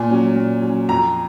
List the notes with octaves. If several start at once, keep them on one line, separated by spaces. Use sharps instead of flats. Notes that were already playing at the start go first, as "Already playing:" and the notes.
Already playing: A#2 G#5
F#3 C#4
A#2
F#3 C#4
F2 A#5